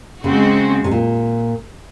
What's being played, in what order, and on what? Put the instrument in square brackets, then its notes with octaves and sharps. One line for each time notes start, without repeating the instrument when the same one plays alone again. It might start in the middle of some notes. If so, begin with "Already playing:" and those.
[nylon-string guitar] C#3 [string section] G#3 C4 F#4
[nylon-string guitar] C3
A#2